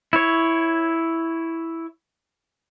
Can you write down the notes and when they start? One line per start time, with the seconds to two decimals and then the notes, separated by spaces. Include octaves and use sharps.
0.13 E4 C#5